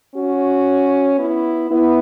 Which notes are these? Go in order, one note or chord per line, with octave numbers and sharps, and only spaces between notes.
C#4 F#4
B3 E4
B3 E4